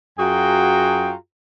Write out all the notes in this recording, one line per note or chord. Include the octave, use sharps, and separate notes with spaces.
F#2 F4 F#4 G#4 G5 A#5